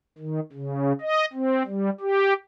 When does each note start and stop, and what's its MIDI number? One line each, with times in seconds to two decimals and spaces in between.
0.18 0.40 51
0.53 0.93 49
1.01 1.26 75
1.33 1.63 60
1.65 1.90 55
2.00 2.33 67